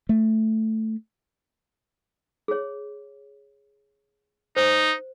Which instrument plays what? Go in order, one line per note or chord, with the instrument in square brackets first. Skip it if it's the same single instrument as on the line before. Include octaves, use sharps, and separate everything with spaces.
[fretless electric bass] A3
[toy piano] G#4 C#5
[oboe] D#4 [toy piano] C5